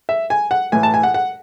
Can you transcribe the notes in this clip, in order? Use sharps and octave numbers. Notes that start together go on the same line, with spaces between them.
E5
G#5
F#5
A2 E3 G#5
A5
G#5
F#5
F#5